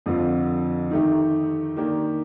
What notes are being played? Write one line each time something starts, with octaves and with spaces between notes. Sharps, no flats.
F2 D3 F3 C4 F4
D#3 A3 D#4 G4
D#3 A#3 D4 G4